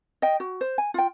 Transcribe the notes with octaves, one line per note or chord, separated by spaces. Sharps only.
D#5 G5
F#4
C5
G#5
F4 G5